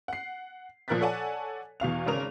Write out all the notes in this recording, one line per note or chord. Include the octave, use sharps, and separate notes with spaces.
F#5 C7
A#2 F3 A#4 F#6 A6 B6
A4 C#5 D5 F#5 G#5 A5
E2 B2 F5 F7
G#1 C#3 A#4 F7